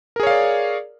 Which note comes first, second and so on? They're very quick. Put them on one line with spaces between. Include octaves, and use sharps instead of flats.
A#4 G#4 C#5 F5 D5